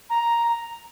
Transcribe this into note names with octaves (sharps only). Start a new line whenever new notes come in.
A#5